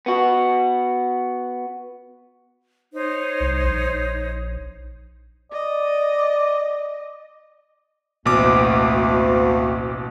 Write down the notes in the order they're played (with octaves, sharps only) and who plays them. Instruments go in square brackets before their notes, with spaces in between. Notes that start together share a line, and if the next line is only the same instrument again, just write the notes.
[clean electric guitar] B3 F#4
[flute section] D#4 C5 C#5
[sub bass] C2
A#1
[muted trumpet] D5 [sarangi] D#5
[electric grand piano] A1 B2 D6 [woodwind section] D2 A#3